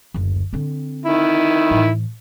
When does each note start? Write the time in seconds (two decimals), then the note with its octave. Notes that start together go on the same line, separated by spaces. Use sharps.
0.14 F#1 D2
0.53 D3 C4
1.05 D#3 E4
1.71 A2 E3